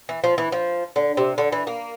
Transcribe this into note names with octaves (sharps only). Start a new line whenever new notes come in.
E3
F3
E3
F3
D3
C3
D3
E3
A#3